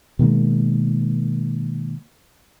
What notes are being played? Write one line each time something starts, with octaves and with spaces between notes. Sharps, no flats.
B2 D#3 G#3 A#3